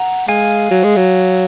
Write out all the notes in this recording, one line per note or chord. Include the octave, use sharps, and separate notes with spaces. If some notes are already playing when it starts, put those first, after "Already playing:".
Already playing: F#5 A#5
G#3 F5 G#5
F#3
G#3
F#3